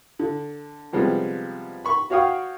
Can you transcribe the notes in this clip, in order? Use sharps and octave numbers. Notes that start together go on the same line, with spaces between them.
D3
C3 F3 G3 G#3 B3
B5 C#6
F#4 C#5 F5 G5 D#6